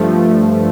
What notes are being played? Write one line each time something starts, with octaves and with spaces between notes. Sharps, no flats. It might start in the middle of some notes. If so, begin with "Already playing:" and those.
Already playing: G2 F3 A3